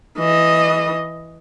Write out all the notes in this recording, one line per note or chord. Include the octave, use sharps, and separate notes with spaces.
E3 D#5